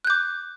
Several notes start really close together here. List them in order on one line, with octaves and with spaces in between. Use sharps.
F#6 G6 D6